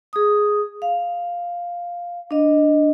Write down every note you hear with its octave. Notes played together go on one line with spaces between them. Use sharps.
G#4 D#6
F5
D4 D#5